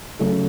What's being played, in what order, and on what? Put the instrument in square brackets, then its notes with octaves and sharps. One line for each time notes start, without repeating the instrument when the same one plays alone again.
[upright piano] C#3 F#3 A3